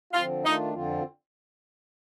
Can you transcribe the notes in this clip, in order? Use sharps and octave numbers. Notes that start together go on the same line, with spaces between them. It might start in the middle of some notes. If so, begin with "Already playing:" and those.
D3 F3 C4 F4
D#3 A3 D4 D#4 F4
F2 D3 F3 C4 F4